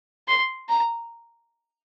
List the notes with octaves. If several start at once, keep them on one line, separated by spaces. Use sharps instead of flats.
C6
A#5